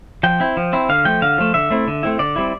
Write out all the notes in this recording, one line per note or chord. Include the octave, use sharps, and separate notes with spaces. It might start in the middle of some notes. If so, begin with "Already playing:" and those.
F3 G5
C4 E4
F3
C4 E4
D3 F5
F3 A3 G5
D3 F5
F3 A3
D3 E5
A3 C4 E4
D3
A3 C4 E4
D3 D5
G3 C4 E4